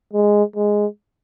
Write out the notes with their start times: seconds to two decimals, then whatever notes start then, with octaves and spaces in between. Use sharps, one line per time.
0.13 G#3
0.56 G#3